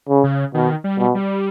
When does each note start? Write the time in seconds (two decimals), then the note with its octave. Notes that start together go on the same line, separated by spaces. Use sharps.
0.09 C#3
0.24 C#3
0.54 B2 D#3
0.84 G3
0.99 B2
1.15 G3